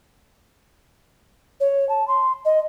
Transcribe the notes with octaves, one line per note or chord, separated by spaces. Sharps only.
C#5
A5
C6
D#5